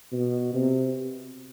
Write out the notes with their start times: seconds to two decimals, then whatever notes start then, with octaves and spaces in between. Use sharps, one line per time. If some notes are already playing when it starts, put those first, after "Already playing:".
0.12 B2
0.54 C3